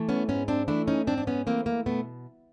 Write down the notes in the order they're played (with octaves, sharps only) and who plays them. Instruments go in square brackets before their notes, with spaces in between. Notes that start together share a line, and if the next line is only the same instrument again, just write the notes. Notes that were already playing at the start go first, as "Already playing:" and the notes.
Already playing: [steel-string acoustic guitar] E3 A3
B3 C#4
G#2 B3 C#4
C4 D4
E3 A3 D4 E4
C#4 D#4
G#2 C4 D4
D4
B3 C#4
E3 A3 A#3 C4
A#3
B2 A3 B3